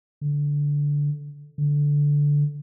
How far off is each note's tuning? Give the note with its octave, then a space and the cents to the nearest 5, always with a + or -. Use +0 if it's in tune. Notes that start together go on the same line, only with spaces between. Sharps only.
D3 -15
D3 -10